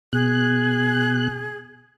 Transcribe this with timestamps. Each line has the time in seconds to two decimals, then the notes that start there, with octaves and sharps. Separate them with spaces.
0.13 B2 G#4 F#6